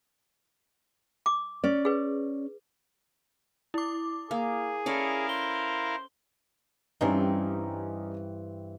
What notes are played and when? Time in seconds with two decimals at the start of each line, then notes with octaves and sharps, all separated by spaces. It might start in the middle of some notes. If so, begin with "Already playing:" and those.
1.26 D6
1.64 C#4 D5
1.85 G#4 B4
3.74 E4 D6
4.31 A#3 G#4
4.86 C#4 E4 A4 A#4 D5 F5
5.29 C5 G7
7.01 G2 E3 G3 C4 C#4 D#4